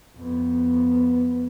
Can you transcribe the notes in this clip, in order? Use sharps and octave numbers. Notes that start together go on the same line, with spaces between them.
F2 B3